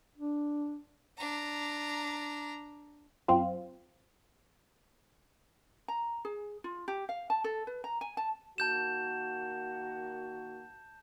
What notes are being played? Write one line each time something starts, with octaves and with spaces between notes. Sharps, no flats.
D4
D4 A#5
F#2 C4 F4
A#5
G#4
F4
G4
F5
A5
A4
B4
A#5
G#5
A5
D#3 A#3 F#4 A5 G6 E7